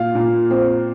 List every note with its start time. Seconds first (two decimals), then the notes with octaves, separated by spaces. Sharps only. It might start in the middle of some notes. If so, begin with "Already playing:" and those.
Already playing: A#2 F5
0.15 A#2
0.51 C4